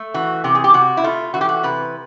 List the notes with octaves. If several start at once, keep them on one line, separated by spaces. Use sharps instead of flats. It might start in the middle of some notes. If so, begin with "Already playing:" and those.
Already playing: A3
E3 F#4
C3 G4
G#4
G4
C3 F#4
E4
A3 F4
E3 F#4
G4
F#4
C3 B4